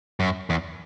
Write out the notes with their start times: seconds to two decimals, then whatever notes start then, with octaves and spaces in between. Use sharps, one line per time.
0.20 F#2
0.50 E2